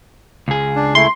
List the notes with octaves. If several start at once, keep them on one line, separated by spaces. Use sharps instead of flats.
C#2 G#4
D4
A3 E4 C6